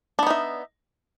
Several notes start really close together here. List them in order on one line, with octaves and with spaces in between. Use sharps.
D4 B3 D#4 E5